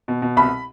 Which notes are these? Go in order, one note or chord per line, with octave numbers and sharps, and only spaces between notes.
B2
B2
C2 B5